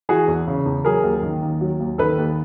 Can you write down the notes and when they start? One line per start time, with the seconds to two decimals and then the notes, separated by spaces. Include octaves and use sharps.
0.09 E3 F#4 G#4
0.28 E2
0.47 C#3
0.66 E2
0.85 F#3 G#4 A#4
1.04 D#2
1.23 D#3
1.43 D#2
1.61 F#3
1.80 D#2
1.98 D#3 A4 B4
2.18 D#2